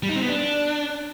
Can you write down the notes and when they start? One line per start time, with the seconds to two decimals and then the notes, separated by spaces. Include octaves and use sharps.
0.03 G3
0.09 D#4
0.16 C4
0.22 B3
0.29 D4